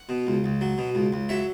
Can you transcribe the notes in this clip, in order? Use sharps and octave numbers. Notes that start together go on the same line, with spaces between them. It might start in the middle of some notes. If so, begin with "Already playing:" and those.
Already playing: F#5
B2
C#2
C#2
F#3
B2
C#2
C#2
F#3 C#5 E5